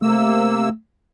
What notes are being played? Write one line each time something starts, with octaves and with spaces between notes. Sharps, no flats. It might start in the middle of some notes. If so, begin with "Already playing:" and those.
C3 A3 A#3 E6